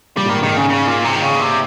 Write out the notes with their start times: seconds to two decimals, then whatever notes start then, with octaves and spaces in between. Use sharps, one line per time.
0.17 A#2 G3
0.26 G#2
0.29 D#3
0.43 G#2 D#3
0.57 C#3
0.69 C#3
0.87 A#2
1.05 C3
1.15 D#3
1.23 C#3
1.41 C3